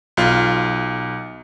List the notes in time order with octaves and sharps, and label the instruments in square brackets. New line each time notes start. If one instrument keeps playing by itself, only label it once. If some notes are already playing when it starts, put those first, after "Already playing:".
[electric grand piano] B1 F4